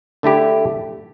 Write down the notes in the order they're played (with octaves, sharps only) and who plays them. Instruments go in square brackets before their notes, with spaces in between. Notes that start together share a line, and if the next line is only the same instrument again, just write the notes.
[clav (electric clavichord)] D3 A3 E4 G4